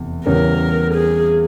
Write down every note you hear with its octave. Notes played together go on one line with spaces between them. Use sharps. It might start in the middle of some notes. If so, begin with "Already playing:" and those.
Already playing: F1 E2
E2 C#3 G3 C#4 A#4
G#4